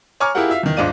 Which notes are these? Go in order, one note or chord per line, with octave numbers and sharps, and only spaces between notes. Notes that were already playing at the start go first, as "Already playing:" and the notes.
C#5 G#5 A#5 C#6 D6 F6
E4 F4 G4 G#4 A#4 F#5
F4 E5 F5
E2 D#3
D#1 G#2 D4 F4 D5 D#7